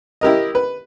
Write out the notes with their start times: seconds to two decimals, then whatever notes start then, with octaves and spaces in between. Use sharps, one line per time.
0.21 E4 G4 A#4 D#5
0.55 B4